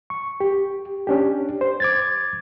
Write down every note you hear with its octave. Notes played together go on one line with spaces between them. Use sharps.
C#6
G4
C#4 D4 G4
C5
D6 G#6 A6